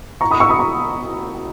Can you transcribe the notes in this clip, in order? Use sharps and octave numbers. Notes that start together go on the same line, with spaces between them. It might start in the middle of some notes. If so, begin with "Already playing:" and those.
A#5 C#6
B5 D#6
C#6 E6
B5 D#6
A#5 C#6